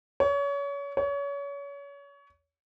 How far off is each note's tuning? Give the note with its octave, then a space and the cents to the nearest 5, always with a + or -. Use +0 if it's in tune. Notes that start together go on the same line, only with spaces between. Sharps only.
C#5 +30
C#5 +30